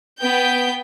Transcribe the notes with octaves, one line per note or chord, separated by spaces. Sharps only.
B3 G5 G6